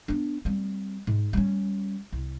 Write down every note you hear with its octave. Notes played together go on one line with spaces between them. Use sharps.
B3 D4
G3 C4
G#2
G3 C#4
C2